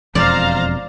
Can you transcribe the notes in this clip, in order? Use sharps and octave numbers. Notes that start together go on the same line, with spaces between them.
E1 F2 C5 D5 F5 A#5